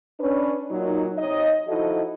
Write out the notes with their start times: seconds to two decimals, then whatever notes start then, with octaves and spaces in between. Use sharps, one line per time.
0.20 C#4 D4 B4
0.70 A#2 F#3 D#4
1.19 C3 D#4 C#5 D#5
1.68 F3 D#4 E4 F#4 A4 D#5